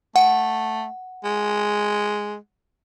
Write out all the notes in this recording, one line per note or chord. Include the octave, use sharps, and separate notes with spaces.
A3 F#5
G#3